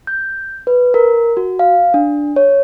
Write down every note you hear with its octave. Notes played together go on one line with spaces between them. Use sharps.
G6
B4
A#4
F#4
F5
D4
C#5